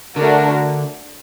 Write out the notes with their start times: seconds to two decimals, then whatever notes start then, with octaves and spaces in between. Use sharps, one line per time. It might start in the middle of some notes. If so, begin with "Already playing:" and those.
0.16 D3 A3 D4 F#4 A#4